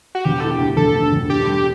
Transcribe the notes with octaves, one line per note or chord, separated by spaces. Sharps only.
F#4
E1 G4
E3 A4
G4
D2
E1 A4
D2
E1
D4 G4
G3